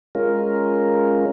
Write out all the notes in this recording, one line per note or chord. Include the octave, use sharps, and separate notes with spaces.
G#3 C#4 F4 A#4